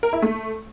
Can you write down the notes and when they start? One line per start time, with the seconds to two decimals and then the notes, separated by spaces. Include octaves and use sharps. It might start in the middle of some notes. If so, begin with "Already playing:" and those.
0.03 A#4
0.13 E4
0.22 A3